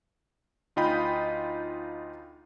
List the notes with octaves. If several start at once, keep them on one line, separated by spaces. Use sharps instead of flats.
D2 D#4 F4 D#5 G5 B5